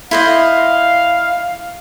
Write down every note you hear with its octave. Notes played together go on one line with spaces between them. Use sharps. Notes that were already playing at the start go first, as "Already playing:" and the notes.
E4 C5 D#5 F5